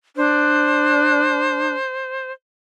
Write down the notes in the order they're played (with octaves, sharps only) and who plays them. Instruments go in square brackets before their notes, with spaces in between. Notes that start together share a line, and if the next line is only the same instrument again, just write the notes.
[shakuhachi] D4 [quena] C5